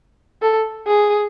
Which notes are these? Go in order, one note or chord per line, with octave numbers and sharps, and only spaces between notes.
A4
G#4